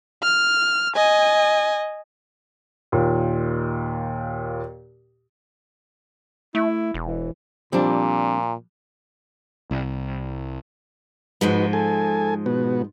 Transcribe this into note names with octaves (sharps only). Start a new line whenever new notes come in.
F6
D#5 G#5
D#2 A#2
A3 E4
E1
E3
A#2 F3 G3 C4 D4
C2
G#2 F3 G#3 D#4 F#4 B4
A4 G#5
B2 B3 F#4